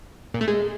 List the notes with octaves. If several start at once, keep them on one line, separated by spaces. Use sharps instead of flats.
A#2
A3
G#3